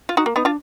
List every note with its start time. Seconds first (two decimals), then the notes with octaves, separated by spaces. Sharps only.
0.09 F4
0.17 D#4 F#4
0.26 A#3
0.36 B3 D#4
0.45 D4 F4